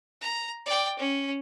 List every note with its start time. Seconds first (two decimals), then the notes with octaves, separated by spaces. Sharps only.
0.21 A#5
0.66 D5 G5
0.98 C#4